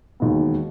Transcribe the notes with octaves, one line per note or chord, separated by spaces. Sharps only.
E1 D#2 D#3 G#3 B3